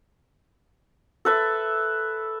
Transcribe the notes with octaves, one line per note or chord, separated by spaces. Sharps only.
A4 B4 E5